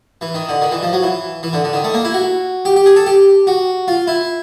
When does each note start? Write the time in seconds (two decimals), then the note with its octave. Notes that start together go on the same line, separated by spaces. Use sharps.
0.21 E3
0.35 D#3
0.49 D3
0.62 D#3
0.72 E3
0.83 F3
0.93 F#3
1.03 E3
1.43 E3
1.53 D3
1.64 D3
1.73 D#3
1.84 A3
1.94 A#3
2.05 E4
2.14 F#4
2.65 G4
2.76 G4
2.86 G#4
2.96 A4
3.07 G4
3.47 F#4
3.88 F4
4.07 E4